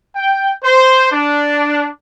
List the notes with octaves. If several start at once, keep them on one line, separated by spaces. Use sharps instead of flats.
G5
C5
D4